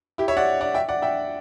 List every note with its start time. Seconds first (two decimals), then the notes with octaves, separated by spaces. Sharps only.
0.18 E4 G4
0.28 C#5 E5
0.37 D5 F#5
0.61 D5 F#5
0.74 E5 G5
0.89 D5 F#5
1.02 E5 G5